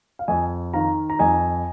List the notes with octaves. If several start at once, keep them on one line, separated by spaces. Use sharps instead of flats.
F5
F2 D#5 G#5
D#3 F5 A#5
A#5
F2 D#5 G#5